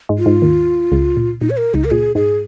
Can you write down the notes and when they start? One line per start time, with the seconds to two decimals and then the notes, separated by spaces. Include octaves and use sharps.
0.09 G#2 G#3
0.18 F4
0.26 G#2 G#3
0.42 D#2 D#3
0.92 C#2 C#3
1.17 A#2
1.41 A#2 D#4
1.50 C#5
1.57 A#4
1.74 C#2 C#3 D#4
1.85 A#4
1.91 A#2 G#4
2.15 G#2 G#3 G#4